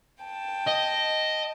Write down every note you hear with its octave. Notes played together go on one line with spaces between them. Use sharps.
G5 A5
D#5